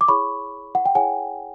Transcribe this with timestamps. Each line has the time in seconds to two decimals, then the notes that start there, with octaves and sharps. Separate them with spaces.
0.01 D6
0.08 E4 G#4 C#5 B5 C#6
0.75 F#5
0.86 G5
0.95 E4 G#4 C#5 F#5 G#5